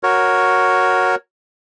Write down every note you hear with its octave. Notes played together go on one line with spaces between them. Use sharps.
F#4 A#4 C#5